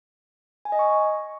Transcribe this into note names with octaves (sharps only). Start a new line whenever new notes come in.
G#5
D#5
C#6